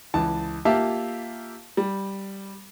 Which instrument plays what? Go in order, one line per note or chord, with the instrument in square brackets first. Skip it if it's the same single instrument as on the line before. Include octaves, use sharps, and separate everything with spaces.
[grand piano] C#2 E3 A5
A#3 F4 G4 E5 F5 A5
G3